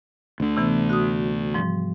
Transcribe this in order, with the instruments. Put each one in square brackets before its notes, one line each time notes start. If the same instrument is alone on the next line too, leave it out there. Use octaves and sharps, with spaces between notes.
[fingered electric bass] D2 D3
[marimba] C3 E3 B3
F#4 D#6
G#2 F3 G3